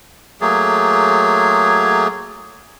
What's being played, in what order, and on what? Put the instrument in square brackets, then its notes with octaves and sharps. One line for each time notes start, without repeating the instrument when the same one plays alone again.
[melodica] F#3 A3 A#3 G#4